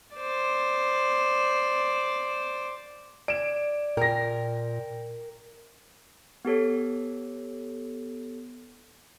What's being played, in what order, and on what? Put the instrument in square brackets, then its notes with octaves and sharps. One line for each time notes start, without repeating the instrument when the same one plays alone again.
[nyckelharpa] C5 D5
[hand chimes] D5 [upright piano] D7 E7
[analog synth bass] A#2 [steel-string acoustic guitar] A#4 [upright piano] G5 A#6
[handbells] B3 G4 A4 C#5